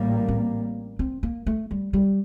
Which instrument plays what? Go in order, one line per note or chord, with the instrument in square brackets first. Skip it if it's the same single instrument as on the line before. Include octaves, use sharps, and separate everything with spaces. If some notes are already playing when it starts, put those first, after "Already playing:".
Already playing: [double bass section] A1 A2 G3 A#3
[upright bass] C4
C4
A#3
A3
G3
G3